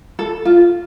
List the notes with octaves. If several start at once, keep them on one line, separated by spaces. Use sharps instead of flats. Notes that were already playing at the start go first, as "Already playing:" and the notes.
A4
F4